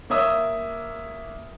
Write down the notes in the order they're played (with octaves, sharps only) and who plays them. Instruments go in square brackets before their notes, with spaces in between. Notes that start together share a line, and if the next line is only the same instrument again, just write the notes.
[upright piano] A#3 C#5 E5 D#6